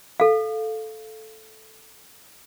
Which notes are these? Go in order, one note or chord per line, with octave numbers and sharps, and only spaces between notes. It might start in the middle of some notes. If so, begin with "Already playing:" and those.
A4 F5